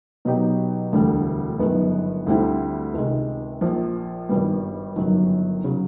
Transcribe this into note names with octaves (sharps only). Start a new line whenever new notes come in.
B2 F#3 B3 D#4 G4
E1 D2 D3 G3
G1 F#2 D#3 G#3 B3
D2 D3 G3 C4 E4
C#2 C3 D#3 G#3
A#1 A#2 F3
G#1 G2 D#3 G3 B3
G1 F#2 D#3 F#3
C#3 F#3